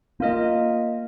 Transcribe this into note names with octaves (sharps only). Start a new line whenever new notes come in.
A#3 F4 A#4 D#5